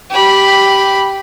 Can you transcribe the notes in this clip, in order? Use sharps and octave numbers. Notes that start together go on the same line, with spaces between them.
G4 B5